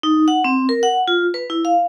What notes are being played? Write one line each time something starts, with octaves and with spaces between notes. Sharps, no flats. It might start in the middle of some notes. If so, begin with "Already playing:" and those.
D#4
F#5
C4
A#4
F#5
F4
B4
E4
F5